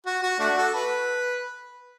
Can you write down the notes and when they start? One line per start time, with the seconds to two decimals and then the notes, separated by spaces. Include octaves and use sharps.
0.06 F#4
0.23 F#4
0.39 A3 D4 F#4
0.58 F#4 A4
0.75 B4